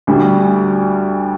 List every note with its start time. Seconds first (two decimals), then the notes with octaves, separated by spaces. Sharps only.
0.07 D2 D3 G3